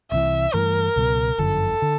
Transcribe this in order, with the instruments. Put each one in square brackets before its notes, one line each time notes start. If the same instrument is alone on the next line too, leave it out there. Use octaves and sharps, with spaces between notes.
[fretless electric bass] C2 C3 E3 [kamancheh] E5
[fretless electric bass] G2 E3 A3 [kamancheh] A#4
[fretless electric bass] C#2 B2 F#3
[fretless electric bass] G1 F#2 D3 F3 [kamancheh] A4
[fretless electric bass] D3